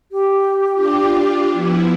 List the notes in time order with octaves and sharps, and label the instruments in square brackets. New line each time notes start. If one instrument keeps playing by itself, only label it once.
[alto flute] G4
[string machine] D4 F4
F3 B3 E4